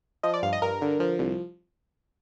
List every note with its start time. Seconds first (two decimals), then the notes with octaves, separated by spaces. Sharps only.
0.23 F3 D#5
0.34 D5
0.43 G2 F5
0.53 D#5
0.62 G2 A#4
0.81 D3
1.00 F3
1.19 C2